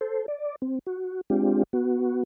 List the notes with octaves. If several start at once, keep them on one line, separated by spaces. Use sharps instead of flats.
A4 C5
D5
C4
F#4
G#3 C4 D4 F4 G4
B3 F#4